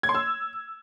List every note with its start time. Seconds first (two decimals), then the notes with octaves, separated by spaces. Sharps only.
0.03 G#6
0.09 C6
0.15 E6